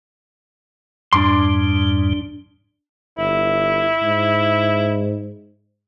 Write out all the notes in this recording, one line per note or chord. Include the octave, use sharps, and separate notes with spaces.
F2 G#2 G3 D4 C6
G1 E4
G#2